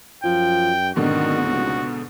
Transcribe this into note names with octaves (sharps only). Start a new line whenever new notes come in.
F#2 F3 G5
D1 G#2 B2 D3 D#3 F#4
C#2